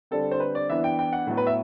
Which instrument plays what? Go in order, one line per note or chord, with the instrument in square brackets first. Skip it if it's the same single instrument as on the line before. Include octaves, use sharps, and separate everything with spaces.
[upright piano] D3 G3 C4 A4
C5
B4
D5
E3 B3 D4 E5
G5
G5
F#5
A2 F#3 B3
B4
E5